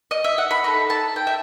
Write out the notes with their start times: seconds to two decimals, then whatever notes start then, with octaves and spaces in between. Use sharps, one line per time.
0.11 D#5
0.24 E5
0.38 F#5
0.51 B5
0.64 D#4 A4 B5
0.90 A5
1.16 G5
1.27 E5